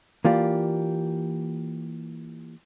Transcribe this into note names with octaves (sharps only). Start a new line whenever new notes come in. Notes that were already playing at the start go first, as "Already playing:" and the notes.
E3 A#3 F4 G4 D5